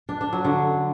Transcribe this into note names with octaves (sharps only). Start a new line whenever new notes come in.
D4
D4
F#3
D3